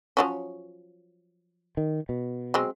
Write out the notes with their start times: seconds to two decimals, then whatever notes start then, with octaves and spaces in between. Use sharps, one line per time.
0.17 F3 F#3 C#4
1.77 D#3
2.09 B2
2.54 F#3 G#3 C4